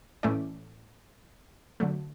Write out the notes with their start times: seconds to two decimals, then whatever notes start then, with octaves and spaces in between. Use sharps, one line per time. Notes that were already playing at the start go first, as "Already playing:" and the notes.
0.23 A2 E3 A3 C#4 D5
1.80 D3 F#3 A3